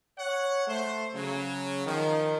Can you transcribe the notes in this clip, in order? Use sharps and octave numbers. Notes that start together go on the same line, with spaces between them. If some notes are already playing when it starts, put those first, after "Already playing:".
C#5 F#5
A3 C5
C#3 F#3
D#3 F3